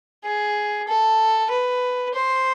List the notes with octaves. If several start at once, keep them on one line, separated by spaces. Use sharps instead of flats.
G#4
A4
B4
C5